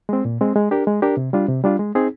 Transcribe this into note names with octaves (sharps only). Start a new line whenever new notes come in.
G#3 C4
A#2
G#3 C4
G#3
D4 G4 A#4
G#3
D4 G4 A#4
C3
G3 D4 F4
C3
G3 D4 F4
G#3
C4 D#4 G#4